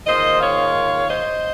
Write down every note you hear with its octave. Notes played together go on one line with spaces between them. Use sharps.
G#2 D#3 A#3 F4 C5 D#5
C#5 F5
C5 D#5